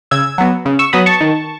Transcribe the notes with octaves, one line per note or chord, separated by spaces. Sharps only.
C#3 E6 G#6
F#3 B3
C#3
C#6 E6
F#3 B3 B5 D#6
A5 C#6
D#3